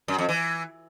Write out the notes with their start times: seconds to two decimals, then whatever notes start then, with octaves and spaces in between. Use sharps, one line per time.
0.08 F#2
0.18 F2
0.29 E3